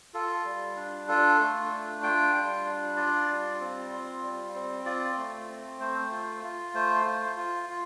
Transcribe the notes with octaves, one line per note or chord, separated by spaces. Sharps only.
F4 A4
G3
D4
F4 A4
A3
D4
F4 G5
G3
D4
F4 D5
G3
C4
F4
G3
C4
F4 D5
A3
C4
A3 C5
F4
F4
A3 C5
F4
F4
F4